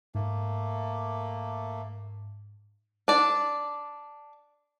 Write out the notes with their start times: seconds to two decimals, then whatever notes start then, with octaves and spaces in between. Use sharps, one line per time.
0.15 G#2 A3 A#3
3.08 D4 D5